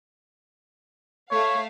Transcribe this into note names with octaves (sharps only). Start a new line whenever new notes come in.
A3 C#5 E5 F5